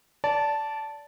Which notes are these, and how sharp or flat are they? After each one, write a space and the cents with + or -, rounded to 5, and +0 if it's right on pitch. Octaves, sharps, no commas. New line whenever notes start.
D5 -20 A5 +0